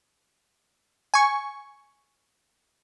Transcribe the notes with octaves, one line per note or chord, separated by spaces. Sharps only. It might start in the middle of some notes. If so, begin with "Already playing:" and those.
G#5 C#6